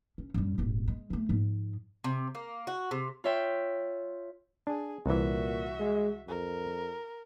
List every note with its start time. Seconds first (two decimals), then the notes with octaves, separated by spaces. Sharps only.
0.18 C#4
0.34 F#2 G3
0.58 D#1 G#1
0.88 G#3
1.10 D3 A3
1.29 G#2 F3
2.04 C3
2.35 A#3
2.67 F#4
2.91 C3
3.24 F4 C#5 E5 G5
4.67 D4 G#4
5.06 C2 A#2 E3 F#4 E5
5.79 G#3
6.28 F2 A#4